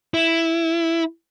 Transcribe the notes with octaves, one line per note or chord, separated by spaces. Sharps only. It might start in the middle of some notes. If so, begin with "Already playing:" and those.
E4